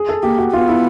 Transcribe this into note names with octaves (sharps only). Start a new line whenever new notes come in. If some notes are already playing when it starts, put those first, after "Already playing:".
Already playing: G#4
A4
A#3 G4
F#4
B3 F4
E4